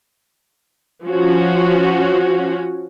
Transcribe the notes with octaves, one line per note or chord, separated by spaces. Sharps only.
F3 C#4 F#4